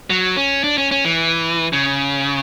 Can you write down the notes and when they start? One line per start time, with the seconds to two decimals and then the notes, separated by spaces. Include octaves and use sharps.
0.10 F#3
0.37 C#4
0.64 D4
0.78 C#4
0.91 C#4
1.05 E3
1.73 C#3